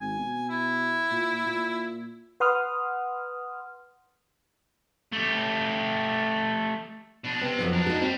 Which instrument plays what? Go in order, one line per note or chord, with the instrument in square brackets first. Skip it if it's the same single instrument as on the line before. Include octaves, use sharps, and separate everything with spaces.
[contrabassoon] G#1 [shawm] G#5
[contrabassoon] B2
[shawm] E4
[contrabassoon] A#2
A#2
[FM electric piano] B4 F#5 C6 D#6 F6
[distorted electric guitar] A3 G4
B2 D4
[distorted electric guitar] C3 [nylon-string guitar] B3
[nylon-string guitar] F2 F3 F#3
[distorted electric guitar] D4 A#4
[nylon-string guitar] D#4 F#4
[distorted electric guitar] G3 [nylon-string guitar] C4